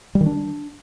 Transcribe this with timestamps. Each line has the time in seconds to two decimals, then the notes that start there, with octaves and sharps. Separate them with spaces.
0.15 G3
0.21 D#3
0.26 D4